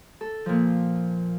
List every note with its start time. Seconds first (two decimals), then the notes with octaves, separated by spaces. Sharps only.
0.21 A4
0.46 A#2 F3